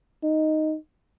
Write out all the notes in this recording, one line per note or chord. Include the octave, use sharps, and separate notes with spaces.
D#4